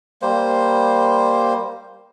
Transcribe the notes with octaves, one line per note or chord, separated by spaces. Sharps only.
G3 A#3 C5